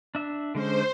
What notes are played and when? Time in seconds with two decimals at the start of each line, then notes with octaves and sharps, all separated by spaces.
0.15 D4 E5
0.55 D3 G#3 C#4 C5